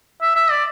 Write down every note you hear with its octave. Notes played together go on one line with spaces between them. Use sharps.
E5
E5
D5